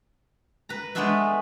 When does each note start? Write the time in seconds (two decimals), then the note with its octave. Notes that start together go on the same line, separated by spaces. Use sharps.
0.69 B4 A#5
0.95 G#3 A3 B3 D4 B4 E5